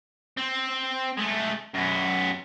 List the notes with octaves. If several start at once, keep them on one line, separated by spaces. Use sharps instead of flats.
C4
G#3 A3
F#2 B3